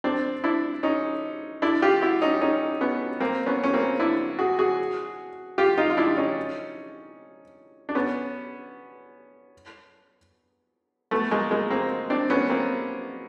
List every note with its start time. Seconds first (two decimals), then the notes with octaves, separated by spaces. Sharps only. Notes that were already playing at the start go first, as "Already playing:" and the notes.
0.04 C4 D4
0.44 D4 E4
0.83 C#4 D#4
1.62 D4 E4
1.82 F4 G4
2.01 E4 F#4
2.22 C#4 D#4
2.41 C#4 D#4
2.81 B3 C#4
3.20 A#3 C4
3.46 B3 C#4
3.64 C#4
3.74 A#3 C4
4.00 D4 E4
4.39 F#4 G#4
4.59 F#4 G#4
5.58 F4 G4
5.78 D#4 F4
5.90 F4
5.97 D4 E4
6.17 C#4 D#4
7.89 D4
7.95 B3 C#4
11.11 A3 B3
11.31 G#3 A#3
11.51 G#3 A#3
11.70 A#3 C4
12.10 C4 D4
12.30 B3 C#4
12.50 A#3 C4